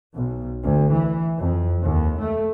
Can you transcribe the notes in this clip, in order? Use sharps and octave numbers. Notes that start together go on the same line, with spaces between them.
B1
D2
E3
F2
D#2
A3